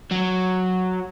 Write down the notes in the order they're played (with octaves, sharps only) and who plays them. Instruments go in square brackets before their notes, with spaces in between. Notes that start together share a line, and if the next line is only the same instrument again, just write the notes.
[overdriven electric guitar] F#3